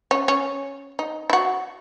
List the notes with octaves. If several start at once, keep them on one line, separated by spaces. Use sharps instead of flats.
C#4
C#4
D#4
E4
F#4